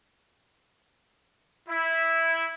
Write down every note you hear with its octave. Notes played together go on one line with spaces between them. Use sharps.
E4